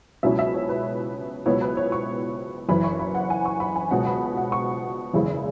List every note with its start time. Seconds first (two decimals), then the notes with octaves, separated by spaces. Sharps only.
0.23 C#2 B2 F#3 C#4 E4 E5
0.39 E5
0.54 C#5
0.69 B4
1.46 C#2 B2 F#3 B3 E4 C#5
1.61 B4
1.77 C#5
1.92 C#6
2.69 F#1 F#2 E3 B5
2.84 C#6
2.99 B5
3.15 F#5
3.30 G#5
3.45 C#6
3.60 B5
3.76 G#5
3.91 C#2 B2 F#3 F#5
4.07 B5
4.37 F#5
4.52 C#6
5.13 F#1 E2 C#3 G#3 E4